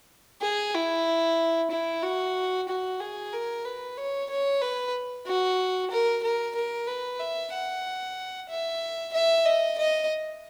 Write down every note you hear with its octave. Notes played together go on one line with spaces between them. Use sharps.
G#4
E4
E4
F#4
F#4
G#4
A#4
B4
C#5
C#5
B4
F#4
A#4
A#4
A#4
B4
E5
F#5
E5
E5
D#5
D#5